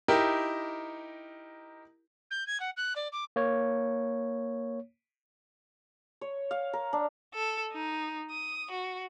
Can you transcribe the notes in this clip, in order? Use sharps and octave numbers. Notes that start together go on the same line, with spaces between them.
D#4 E4 G4 A#4
G6
G#6
F#5
F#6
D5
D6
A#3 C#5
C#5
F5
A#4
D4
A4
D#4
D#6
F#4